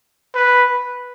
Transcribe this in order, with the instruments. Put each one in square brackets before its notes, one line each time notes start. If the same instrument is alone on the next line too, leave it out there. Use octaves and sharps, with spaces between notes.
[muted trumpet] B4